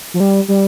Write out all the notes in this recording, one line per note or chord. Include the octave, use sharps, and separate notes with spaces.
F3
G3
G3